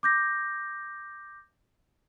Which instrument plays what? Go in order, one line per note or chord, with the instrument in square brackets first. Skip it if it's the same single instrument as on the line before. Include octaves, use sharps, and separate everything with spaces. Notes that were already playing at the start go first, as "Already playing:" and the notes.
[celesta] D6 G6 A#6